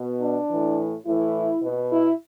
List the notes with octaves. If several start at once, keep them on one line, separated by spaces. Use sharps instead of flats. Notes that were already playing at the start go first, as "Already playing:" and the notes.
Already playing: B2
D4
A2 E3
A2 E3 E4
B2
E4